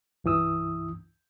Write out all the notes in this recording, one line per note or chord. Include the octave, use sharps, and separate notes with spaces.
C2 G2 E3 E4 D#6 E6